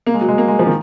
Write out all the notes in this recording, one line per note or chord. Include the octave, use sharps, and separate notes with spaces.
A#3
G#3
F#3
G#3
A#3
G#3
F3
D#3